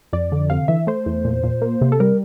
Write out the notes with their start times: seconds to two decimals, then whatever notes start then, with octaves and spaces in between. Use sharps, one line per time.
0.13 F2 D5
0.32 D3
0.50 C3 F5
0.68 E3 E5
0.87 A3 C5
1.06 E2
1.25 A#2
1.44 A#2
1.62 A#3
1.81 C3
1.92 A4
2.00 G3 A#4